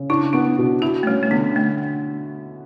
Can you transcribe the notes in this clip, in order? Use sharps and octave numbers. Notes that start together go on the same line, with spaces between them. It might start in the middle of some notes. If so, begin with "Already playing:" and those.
Already playing: C#3
D4 E4
B3 E4
B2
E4 F#4
A3
G3 C#4
A3
D3 B3
A3